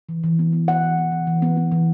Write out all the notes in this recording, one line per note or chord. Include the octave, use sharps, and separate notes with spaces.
E3
E3
B3
B3
B3 F#5
E3
B3
E3
E3
B3
B3
E3